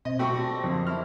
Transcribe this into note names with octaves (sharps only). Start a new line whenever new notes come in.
B2 C4 D#5
A3 F4 F#4 G5 A5 B5 C#6
D4 G4 C5 A#6
F2 A#3 D4 C6
E4 F6